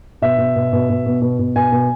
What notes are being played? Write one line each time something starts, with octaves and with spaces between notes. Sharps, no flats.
B2 E5
B2
B2
B2
B2
B2
B2
B2
B2 G#5
B2